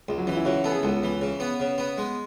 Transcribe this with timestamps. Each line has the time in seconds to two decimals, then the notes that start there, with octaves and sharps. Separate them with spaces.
0.09 C#2 G#3
0.18 F#3
0.27 E3 C#4
0.37 E4
0.45 C#3 F#4
0.64 B3 A4
0.71 G#4
0.83 C#2 A4
1.03 E3
1.22 C#3
1.40 B3
1.60 C#3
1.78 B3
1.98 G#3